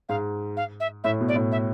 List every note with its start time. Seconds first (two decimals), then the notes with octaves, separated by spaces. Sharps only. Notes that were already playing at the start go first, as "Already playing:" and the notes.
0.09 G#2 F5
0.57 F5
0.80 E5
1.04 A2 E5
1.21 B2
1.28 D5
1.36 A2
1.51 E5